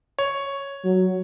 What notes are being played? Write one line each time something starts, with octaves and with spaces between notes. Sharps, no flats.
C#5
F#3